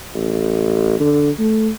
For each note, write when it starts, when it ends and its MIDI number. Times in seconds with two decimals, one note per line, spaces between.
0.15 0.98 33
1.00 1.31 50
1.39 1.70 57